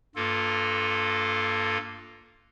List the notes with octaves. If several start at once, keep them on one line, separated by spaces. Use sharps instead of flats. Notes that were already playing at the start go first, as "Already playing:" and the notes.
G2 A#3 F4 A4